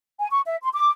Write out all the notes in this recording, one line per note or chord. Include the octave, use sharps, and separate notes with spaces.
G#5
C#6
E5
C6
D6